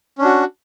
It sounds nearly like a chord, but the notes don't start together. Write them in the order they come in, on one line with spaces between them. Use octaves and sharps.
C#4 D4 F#4